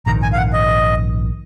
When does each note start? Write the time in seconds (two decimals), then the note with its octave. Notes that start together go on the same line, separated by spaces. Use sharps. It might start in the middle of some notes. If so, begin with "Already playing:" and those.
0.06 A#1 G#2 D#3 A#5
0.23 G#5
0.33 F5
0.37 F#5
0.53 D#5